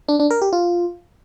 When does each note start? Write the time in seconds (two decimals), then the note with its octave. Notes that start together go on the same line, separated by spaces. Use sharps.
0.08 D4
0.19 D4
0.31 A#4
0.42 G4
0.53 F4